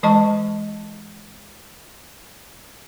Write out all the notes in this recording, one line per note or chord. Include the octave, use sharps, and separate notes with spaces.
E3 G#3 D#5 A5 C#6